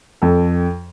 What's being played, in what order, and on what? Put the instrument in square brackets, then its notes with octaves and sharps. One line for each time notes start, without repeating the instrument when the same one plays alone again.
[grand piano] F2 A4